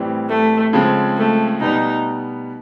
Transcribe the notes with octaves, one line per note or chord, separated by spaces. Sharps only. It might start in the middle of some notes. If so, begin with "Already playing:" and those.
Already playing: A2 E3 G3 C4
A3
C#3 F3 G#3 C4
A3
B2 G3 B3 D#4